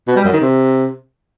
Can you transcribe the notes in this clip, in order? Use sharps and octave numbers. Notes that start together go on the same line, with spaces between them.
B2
G3
F#2
D#3
C3